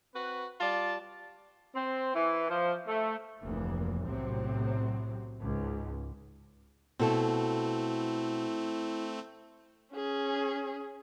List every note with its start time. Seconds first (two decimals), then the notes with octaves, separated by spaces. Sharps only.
0.15 C4 F#4 B4
0.60 G3 F4 D5 A5
1.76 C4
2.15 E3
2.50 F3
2.88 A3
3.41 F1 D2 E3 A#3
4.04 B1 A2 C3 F#3 C4
5.41 C#2 G#2
7.00 B2 A3 C4 E4 A4
9.93 C#4 G#4